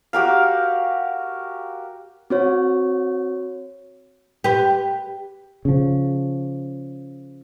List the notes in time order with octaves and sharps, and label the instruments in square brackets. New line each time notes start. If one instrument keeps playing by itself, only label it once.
[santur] F#4 G4 A#4 F5
[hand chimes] C4 F#4 C#5
[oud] G4 B4
[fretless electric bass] C#3 F3